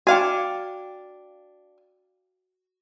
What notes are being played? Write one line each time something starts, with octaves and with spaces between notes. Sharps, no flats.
D4 F#4 F5 G5 G#5